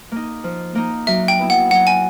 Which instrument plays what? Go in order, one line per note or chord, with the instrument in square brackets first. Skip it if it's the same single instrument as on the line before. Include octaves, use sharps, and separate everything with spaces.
[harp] A#3 D#4
F3
A#3 D#4
[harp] F#3 [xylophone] E5
[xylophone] G5
[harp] B3 E4
[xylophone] F#5
[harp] F#3 [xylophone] F#5
[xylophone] G#5